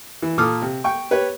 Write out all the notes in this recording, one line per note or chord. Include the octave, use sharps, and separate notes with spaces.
E3
A#2 A4 D6 D#6 F6
C3
G5 C#6
G4 B4 C#5